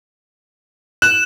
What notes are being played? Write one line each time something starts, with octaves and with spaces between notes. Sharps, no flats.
F#6 E7